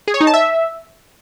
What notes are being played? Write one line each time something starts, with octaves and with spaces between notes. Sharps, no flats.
G#4
C#5
D#4
A5
E5